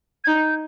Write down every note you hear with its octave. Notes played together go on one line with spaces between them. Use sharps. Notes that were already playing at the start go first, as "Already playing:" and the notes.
G#6
D#4 G6